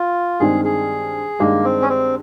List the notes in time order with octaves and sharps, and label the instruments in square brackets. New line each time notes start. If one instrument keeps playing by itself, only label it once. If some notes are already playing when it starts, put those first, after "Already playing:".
Already playing: [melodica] F4
[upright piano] G2 D#3 G#3 C4 [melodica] G#4
[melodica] G#4
[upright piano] G2 D#3 G#3 [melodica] A#3
[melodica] C4
C#4
C4